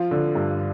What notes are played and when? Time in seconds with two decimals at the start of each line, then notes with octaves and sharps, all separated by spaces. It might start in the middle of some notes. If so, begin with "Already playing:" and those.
Already playing: F3 F4
0.11 D3
0.35 G2